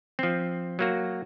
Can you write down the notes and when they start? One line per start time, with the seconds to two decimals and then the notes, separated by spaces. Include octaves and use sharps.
0.19 F3 C4
0.79 F#3 A#3 F#4